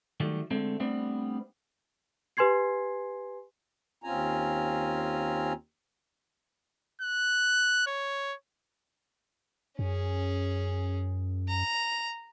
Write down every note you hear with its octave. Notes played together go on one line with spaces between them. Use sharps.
D#3 F#3 G3 A3
D3 G#3 A3 C4
G3 A3 B3 C4 D4
G4 B4 G#5 C6 G#6 C7
D#2 C4 C#4 F4 G#5 A#5
F#6
C#5
F#2 C#4 G#4
A#5